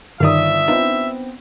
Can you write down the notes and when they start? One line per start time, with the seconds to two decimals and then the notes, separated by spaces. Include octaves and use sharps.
0.20 G1 G2 D#3 D5 E5 D#6
0.68 B3 C4 D4 D#4 F4